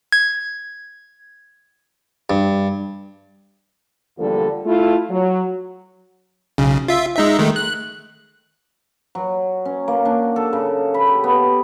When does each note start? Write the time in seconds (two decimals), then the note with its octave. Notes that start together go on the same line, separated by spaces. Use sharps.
0.12 G#6
2.30 G2
4.19 E2 D3 F3 G3 A#3 A4
4.66 A3 E4 F4
5.10 F#3
6.58 B1 C#3
6.88 F4 E5
7.16 G#3 D#4 E5
7.39 D#3 G#3 A3
7.56 F#6
9.15 F#3
9.65 C#4
9.88 A#3
10.05 D4
10.36 A4
10.53 C#3
10.94 B5
11.07 G4
11.24 B3